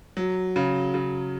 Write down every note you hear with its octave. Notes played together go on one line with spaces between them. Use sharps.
F#3
C#3
C#3